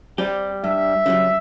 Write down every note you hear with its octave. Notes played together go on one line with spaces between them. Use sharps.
G3 C4 G4
G2 E5
C#3 F#3 G3